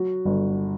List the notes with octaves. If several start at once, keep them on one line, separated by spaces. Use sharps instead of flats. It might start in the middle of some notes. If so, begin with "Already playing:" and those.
Already playing: F#3 F#4
G1